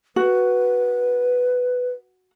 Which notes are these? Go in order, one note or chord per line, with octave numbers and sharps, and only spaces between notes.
F#4 B4